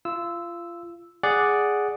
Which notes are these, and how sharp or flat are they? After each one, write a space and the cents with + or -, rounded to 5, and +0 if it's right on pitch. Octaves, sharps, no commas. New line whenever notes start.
F4 -25 E6 +0
G#4 +0 D5 +0 F#5 +0